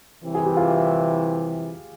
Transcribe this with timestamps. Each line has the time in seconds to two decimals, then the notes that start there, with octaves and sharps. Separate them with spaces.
0.23 C2 C3 E3
0.35 G#4
0.45 G4
0.57 F4 G#4